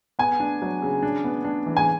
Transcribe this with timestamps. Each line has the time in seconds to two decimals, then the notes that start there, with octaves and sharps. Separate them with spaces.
0.19 B3 G#5
0.40 D4
0.62 F#3
0.82 C#3
1.03 D4
1.24 B3
1.44 D4
1.66 E3
1.77 G#5